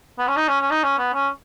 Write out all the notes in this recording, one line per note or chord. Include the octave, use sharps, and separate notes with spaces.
B3
C#4
D#4
C#4
C#4
D#4
C#4
B3
C#4